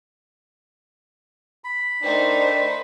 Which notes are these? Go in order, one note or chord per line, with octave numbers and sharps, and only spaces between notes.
B5
A3 D4 D#4 A#4 C5 D5 G5